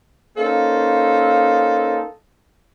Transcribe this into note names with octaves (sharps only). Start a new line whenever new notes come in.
A#3 C#4 D#4 A4 C5 F5